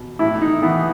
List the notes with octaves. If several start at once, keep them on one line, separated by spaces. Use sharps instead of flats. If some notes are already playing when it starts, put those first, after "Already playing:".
Already playing: B2
A2 E4
D#4
E3 B3